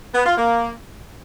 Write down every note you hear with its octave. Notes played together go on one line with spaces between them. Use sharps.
B3
F4
A#3